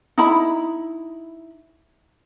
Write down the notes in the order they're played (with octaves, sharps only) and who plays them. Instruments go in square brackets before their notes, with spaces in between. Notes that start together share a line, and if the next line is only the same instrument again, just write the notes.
[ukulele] D#4 E4 B5